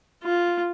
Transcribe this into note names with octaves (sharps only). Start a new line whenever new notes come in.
F4